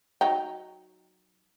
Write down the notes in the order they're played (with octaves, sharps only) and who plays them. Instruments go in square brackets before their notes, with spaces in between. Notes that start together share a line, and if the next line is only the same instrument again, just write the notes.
[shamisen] F#3 D#4 G5